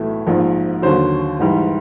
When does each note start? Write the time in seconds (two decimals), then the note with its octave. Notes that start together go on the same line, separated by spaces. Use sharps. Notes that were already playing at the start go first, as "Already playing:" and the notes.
Already playing: B1 A2 E3 A3
0.27 A#1 G#2 F3
0.82 D#2 D3 F#3 C5
1.39 A1 G#2 E3 G3